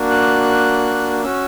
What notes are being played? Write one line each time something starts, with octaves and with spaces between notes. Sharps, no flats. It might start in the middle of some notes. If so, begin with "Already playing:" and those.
Already playing: A#3 D4 F#4
F#6
C#4 F#4 E6